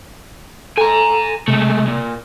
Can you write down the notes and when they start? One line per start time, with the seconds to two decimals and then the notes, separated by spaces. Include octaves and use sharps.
0.78 A4 G#5 A#5
1.48 C3 G#3 A3
1.88 A#2